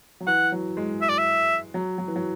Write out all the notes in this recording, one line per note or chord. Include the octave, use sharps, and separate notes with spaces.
F#3
E3 F#5
F#3
G#3
E5
D5
E5
F#3
F#3
E3
F#3